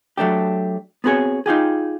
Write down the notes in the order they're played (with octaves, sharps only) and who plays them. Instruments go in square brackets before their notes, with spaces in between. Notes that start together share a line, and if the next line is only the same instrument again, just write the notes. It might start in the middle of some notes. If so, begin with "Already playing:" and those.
[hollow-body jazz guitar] F#3 A3 D4 G4
B3 C4 F#4 G#4 C#5
D#4 F4 G4 G#4